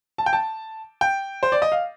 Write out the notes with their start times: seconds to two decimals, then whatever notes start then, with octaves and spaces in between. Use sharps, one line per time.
0.18 A5
0.26 G5
0.33 A5
1.01 G5
1.43 C5
1.52 D5
1.62 D#5
1.72 F5